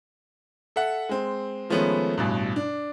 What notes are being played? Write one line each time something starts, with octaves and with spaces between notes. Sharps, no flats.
A4 E5 F#5
G#3 C4
D#3 F3 G#3 A3 B3 C#4
A1 G2 B2
D4